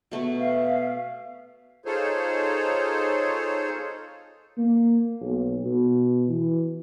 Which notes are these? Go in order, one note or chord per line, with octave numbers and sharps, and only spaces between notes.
B2 A3
E5 F5
D#4 F4 G#4 A4 C5 C#5
A#3
B1
B2
E3